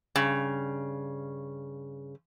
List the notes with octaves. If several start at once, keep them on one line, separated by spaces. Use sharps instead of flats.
G2 C#3